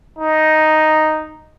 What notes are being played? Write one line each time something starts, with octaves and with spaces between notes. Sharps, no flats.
D#4